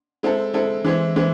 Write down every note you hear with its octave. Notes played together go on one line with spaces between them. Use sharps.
G#3 C4 E4 A4
G#3 C4 E4 A4
E3 G#3 C4 E4
E3 G#3 C4 E4